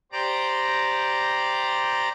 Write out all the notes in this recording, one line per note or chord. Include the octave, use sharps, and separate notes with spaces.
G4 C5 D5 A#5 D6